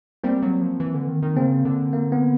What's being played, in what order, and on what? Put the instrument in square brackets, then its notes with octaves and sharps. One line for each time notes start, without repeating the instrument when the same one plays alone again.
[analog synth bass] G3 [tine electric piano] A#3 C4
[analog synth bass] F#3
F3
E3
D3
D#3
D#3
[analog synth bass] C#3 [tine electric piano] A#3 C4
[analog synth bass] D3
[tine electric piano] A#3
B3